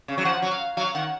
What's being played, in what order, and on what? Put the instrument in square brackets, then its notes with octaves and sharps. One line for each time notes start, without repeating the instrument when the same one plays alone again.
[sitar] C#3
F#3
[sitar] F3 [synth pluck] F#5
[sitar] F#3
[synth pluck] F5
[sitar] F#3 [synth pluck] F5
[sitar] D#3 [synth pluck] F#5